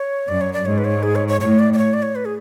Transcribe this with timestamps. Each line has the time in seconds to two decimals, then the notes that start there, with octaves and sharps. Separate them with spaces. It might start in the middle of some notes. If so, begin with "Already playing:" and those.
Already playing: C#5
0.28 F#2 D5
0.41 C#5
0.53 D5
0.66 G#2 C#5
0.78 B4
0.84 C#5
1.03 G#4
1.15 C#5
1.28 C#5
1.41 A2 C#5
1.59 D5
1.73 D5
1.78 C#5
1.94 D5
2.02 C#5
2.15 B4
2.25 G#4